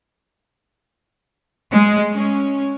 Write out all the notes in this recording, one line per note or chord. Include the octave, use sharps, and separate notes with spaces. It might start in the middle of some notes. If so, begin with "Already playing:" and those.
G#3
C#4